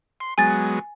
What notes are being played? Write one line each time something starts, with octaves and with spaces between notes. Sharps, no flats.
C6
F#3 G#3 B3 G#5 A6